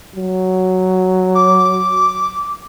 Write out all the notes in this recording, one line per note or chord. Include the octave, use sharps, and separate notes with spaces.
F#3
D6